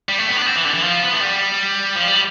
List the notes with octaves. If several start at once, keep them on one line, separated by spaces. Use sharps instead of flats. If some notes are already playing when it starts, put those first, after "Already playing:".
G3
A3
B3
D4
B3
C4
E3
D3
E3
F3
B3
A3
G3
F3
G3